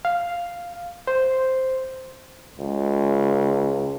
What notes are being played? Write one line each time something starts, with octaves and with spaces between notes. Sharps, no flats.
F5
C5
C#2